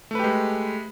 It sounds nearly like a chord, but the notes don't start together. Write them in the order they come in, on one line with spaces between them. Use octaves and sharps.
A3 B4 G4 G#3